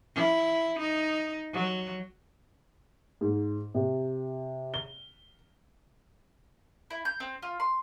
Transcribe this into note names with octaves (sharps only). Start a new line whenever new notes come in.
E4
D#4
F#3
G#2
C3
G7
E4
G6
C4
F4
C6